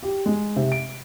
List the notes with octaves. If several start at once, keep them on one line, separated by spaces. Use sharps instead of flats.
G4
G#3
C3
D7